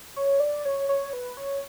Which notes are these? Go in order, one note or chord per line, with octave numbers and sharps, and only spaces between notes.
C#5
D5
C#5
C#5
B4
C#5